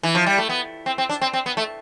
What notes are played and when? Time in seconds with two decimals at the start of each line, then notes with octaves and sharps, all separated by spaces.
0.03 E3
0.15 F3
0.26 G3
0.38 A3
0.49 B3
0.86 C4
0.98 C4
1.09 D4
1.21 C4
1.33 C4
1.46 B3
1.57 A3